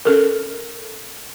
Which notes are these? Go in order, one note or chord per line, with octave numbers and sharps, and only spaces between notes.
C#4 A4 A#4